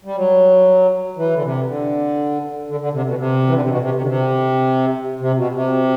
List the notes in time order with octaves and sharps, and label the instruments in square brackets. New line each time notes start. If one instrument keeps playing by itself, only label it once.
[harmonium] G3
F#3
E3
D3
C3
D3
D3
D3
C3
B2
C3
E3
D3
C3
B2
C3
C3
D3
C3
C3
B2
C3